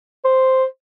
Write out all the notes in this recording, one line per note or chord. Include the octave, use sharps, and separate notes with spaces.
C5